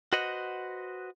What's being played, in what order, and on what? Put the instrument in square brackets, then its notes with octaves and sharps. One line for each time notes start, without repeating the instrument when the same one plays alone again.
[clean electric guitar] F#4 B4 C5 D#5 F#5